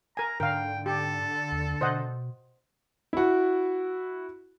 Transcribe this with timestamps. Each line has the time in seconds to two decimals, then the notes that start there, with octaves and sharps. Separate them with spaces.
0.17 A#4 G#5 A#5
0.40 G#2 D3 A#4 F5 G5
0.86 D3 G4 A4
1.52 D#2
1.81 B2 C5 D#5 F#5
3.13 E4 F#4